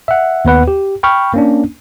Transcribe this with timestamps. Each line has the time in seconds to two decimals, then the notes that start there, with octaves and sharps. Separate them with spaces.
0.08 E5 F#5
0.45 D#2 B3 B4 F#5
0.68 G4
1.03 G5 B5 C#6 F6
1.34 A#3 C#4 D4